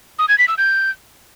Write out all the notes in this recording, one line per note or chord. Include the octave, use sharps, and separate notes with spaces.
D#6
G#6
B6
E6
G6